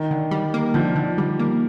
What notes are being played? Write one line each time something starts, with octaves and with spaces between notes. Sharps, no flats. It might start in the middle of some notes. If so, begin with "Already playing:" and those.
Already playing: D#3
D3
G3
A#3
D3 F3
D3
G3
A#3